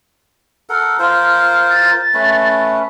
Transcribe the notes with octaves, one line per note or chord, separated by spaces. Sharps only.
A4 A#4 F#5
F4 A#4 C5
A6
A3 C#4 B4